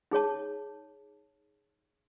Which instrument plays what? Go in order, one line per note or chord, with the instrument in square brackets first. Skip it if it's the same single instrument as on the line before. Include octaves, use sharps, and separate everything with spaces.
[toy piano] D#4 G#4 C#5 A5